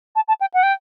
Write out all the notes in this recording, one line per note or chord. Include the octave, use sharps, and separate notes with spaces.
A5
A5
G5
F#5
G5